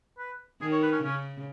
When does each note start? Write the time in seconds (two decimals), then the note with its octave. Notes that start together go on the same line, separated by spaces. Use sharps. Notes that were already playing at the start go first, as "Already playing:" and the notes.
0.18 B4
0.61 D#3 G#4
0.72 C#5
0.83 B4
0.92 C#4
1.03 C#3 C#4